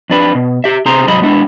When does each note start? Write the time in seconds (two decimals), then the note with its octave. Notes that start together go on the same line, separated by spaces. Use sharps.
0.10 F2 D4 B4
0.35 B2
0.64 G4 E5
0.86 C3 G#4 C5 A#5 C6
1.07 C2 G#2 F#3 D#5 B5
1.22 G#3 B3 D4 E4